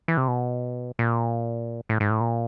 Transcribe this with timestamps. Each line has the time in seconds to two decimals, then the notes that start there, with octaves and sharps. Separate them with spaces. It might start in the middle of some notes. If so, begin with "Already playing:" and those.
0.08 E3
0.17 C3
0.28 B2
0.99 A#2
1.89 A2
2.00 G#2
2.10 A2
2.21 A#2